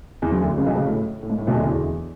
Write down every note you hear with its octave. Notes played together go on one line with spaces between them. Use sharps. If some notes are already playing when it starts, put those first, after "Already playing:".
E2 E3
F#2 F#3
D2 D3
C#2 C#3
B1 B2
C#2 C#3
A2
A2
G#2
A2
B1 B2
D2 D3
E2 E3